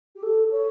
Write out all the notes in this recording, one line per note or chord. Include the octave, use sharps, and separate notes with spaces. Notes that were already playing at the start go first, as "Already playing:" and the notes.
G4
A4
C#5